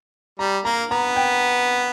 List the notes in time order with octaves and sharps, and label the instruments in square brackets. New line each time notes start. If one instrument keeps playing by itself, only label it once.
[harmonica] G3 [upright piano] A#5
[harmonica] A#3 [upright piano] A#5
[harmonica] B3 [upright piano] A#5
[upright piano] G5